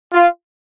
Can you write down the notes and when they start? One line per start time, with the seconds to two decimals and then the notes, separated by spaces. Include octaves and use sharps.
0.11 F4